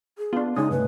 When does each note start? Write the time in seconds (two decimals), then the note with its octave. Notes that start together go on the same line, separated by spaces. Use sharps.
0.18 G#4
0.33 B3 D4 F4
0.57 C#3 G#3 C#4 D#4 D#6
0.71 G2 C3 A3 B4